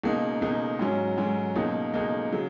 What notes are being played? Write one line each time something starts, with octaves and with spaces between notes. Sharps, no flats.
C#2 B2 A#3 D#4
C#2 B2 A#3 D#4
G#2 F#3 C#4
G#2 F#3 C#4
C#2 B2 A#3 D#4
C#2 B2 A#3 D#4
C#3 F#3